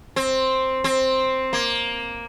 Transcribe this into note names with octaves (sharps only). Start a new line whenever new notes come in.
C4
C4
A#3